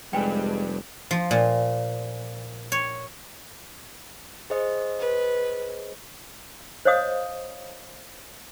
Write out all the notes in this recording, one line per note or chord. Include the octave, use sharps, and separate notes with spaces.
F1 G3 G#3 B4 D5 G5 G#5
F3
A#2
C#5
G#4 C5 D#5
B4
C5 C#5 D#5 F5 D#6